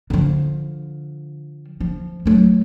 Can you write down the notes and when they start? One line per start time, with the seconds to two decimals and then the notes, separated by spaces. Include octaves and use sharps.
0.10 D3 F3
1.80 F3
2.26 F#3 A3